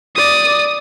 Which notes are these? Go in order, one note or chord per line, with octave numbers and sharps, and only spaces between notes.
D5 D#6